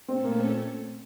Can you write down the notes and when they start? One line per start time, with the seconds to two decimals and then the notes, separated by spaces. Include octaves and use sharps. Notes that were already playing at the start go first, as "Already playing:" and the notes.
0.08 A#2 A3 C4 C#4 A4 C#5
0.24 A#3
0.38 C4